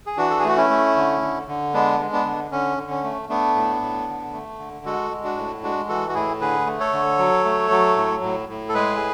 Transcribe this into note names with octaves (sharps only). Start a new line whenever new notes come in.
G#4
E3 D4 F#4
A4
G#4
A3 F#4
C#4 E4
A3
D3
D3
D3
G#3 B3 D4
G#3
B3 D4
D3
D3 C#4
D3
C#4
A3
A3 B3 D4
A2
A2
D3
A3
D3
G#3 F#4 A4
G#3
D4 F#4
A2
G#3 D4 F#4
E3 F#4 A4
F#4
A2 E4 G#4
D3 G#4 B4
A3
A4 C#5
D3
F#3
A3
F#3
A2
A2
A2
A4
G#3 G#4 B4